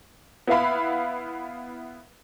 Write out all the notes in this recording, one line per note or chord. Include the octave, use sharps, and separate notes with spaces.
B3 E4 B4 E5 F5 B5